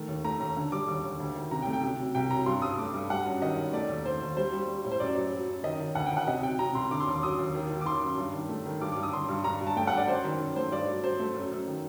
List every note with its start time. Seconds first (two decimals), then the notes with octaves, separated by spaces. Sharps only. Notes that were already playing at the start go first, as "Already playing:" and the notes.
Already playing: D#3 A3
0.08 D#2
0.24 A3 A#5
0.40 D#2 A#5
0.57 D3
0.72 G3 D6
0.88 D#2
1.04 D#2
1.20 D2
1.35 D#3
1.51 C3 A#5
1.62 G5
1.67 A3
1.73 G5
1.83 C3
1.99 F#3
2.15 C2 G5
2.30 F#3 A#5
2.46 G2 C6
2.62 G2 D#6
2.78 A3 D6
2.94 G2
3.10 G3 F#5
3.26 F#2
3.42 D#3 D#5
3.58 D#3
3.73 A3 D5
3.89 D#2
4.05 D#2 C5
4.22 D#2
4.37 G3 C5
4.53 G3
4.68 G3
4.84 A2
4.91 C5
5.00 F#2 D5
5.16 F#3
5.32 F#3
5.48 F#2
5.63 D#3 D#5
5.80 D#3
5.95 D2 F#5
6.06 G5
6.11 D#3
6.17 F#5
6.27 C3 D#5
6.43 F#3 G5
6.59 C3 A#5
6.75 C2 C6
6.91 D3 D6
7.00 C6
7.07 D#2 D6
7.23 F#3 D#6
7.39 D#2
7.55 D#3
7.70 D#3
7.81 D6
7.86 D#3 C6
8.02 F#2
8.18 G2
8.34 D#3
8.49 A3
8.66 D#3
8.81 G2 D6
8.92 D6
8.97 G2
9.03 D#6
9.13 D3 C6
9.29 G2
9.44 G2 A#5
9.61 G2
9.67 A5
9.76 A3 G5
9.87 F#5
9.92 G2 D5
10.08 F#2 C5
10.24 D#3
10.40 F#2
10.56 A3 C5
10.72 G2 D5
10.88 F#3
11.03 F#3 C5
11.19 A3
11.36 F#2
11.51 F#2
11.67 D#3